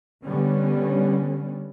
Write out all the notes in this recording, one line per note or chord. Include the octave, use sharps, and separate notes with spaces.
D3 G3 B3 C#4